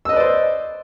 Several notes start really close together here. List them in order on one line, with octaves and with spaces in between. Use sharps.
E6 D#5 B4 D5 C5